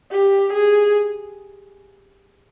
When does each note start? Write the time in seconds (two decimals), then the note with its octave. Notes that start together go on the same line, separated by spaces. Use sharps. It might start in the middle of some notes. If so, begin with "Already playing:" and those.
0.11 G4
0.53 G#4